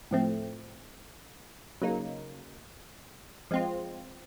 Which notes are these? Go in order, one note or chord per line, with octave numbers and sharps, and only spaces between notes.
A2 F3 A3 C4
C#3 F#3 A#3 D#4
F3 G#3 C4 F4